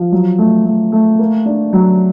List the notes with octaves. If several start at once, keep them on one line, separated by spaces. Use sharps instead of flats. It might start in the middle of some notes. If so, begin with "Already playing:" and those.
Already playing: F3
F#3
A3
A3
A3
A#3
D4
F#3